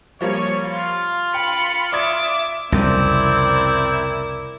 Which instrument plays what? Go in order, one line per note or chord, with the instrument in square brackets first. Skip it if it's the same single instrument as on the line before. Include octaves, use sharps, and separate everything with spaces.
[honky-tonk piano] F3 G3 A#3 [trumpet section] C#4 C#5
[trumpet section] F4
[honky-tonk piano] G5 [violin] B5 C#7
[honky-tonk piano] D5 D#6 G#6 [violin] E5 D6
[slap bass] C2 F2 C#3 [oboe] C4 [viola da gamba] E4 [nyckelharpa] A#4 D5